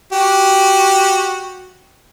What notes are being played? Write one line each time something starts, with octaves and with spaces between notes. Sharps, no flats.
F#4 G4